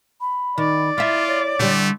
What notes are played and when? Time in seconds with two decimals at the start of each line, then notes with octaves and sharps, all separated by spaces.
0.21 B5
0.58 D#3 D5
0.98 E4 F4 E5
1.28 C#5
1.59 D3 G3 A3